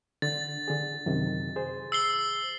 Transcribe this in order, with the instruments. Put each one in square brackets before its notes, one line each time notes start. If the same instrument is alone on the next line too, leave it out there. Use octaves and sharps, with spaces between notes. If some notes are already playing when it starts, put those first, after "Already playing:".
[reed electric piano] D3 [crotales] A6
[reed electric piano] D3 G#4
F#2 C3 D#3
G#4 C5
[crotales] E6 C7 G7